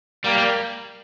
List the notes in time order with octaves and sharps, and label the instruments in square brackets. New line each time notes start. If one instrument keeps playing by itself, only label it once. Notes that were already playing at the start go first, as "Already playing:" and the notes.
[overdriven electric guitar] G3 [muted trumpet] A#3
[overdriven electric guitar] G3